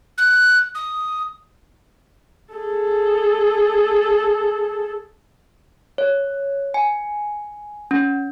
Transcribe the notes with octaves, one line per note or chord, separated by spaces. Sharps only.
F#6
D#6
G#4 A4
C#5
G#5
C#4